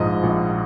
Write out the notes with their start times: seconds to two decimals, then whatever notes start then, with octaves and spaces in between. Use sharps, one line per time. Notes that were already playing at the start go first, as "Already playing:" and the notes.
Already playing: A#1 G#2 F3 D#5
0.23 A#1